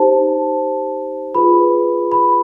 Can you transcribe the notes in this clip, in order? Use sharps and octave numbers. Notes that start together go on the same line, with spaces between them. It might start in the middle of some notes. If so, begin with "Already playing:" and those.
Already playing: D#4 G4 C5 A5
F4 G#4 B4 B5
B5